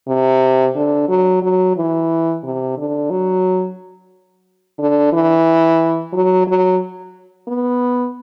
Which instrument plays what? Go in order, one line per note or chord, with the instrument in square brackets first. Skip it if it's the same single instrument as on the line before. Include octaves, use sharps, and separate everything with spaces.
[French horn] C3
D3
F#3
F#3
E3
C3
D3
F#3
D3
E3
F#3
F#3
B3